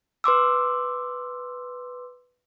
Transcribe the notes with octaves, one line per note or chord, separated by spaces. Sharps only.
B4 C6 D6 E6